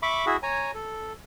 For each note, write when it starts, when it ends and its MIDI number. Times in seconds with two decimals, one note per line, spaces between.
0.03 0.26 76
0.03 0.26 83
0.03 0.26 85
0.03 0.26 86
0.26 0.37 64
0.26 0.37 66
0.26 0.37 68
0.26 0.37 76
0.43 0.71 73
0.43 0.71 80
0.43 0.71 82
0.74 1.13 69